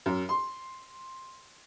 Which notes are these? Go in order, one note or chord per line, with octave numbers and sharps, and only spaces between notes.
F#2
C6